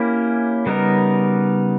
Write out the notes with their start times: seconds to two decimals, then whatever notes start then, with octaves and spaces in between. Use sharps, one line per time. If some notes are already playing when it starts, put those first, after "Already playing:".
Already playing: A#3 C#4 E4 G4
0.66 C#3 G3 B3 D#4 A#4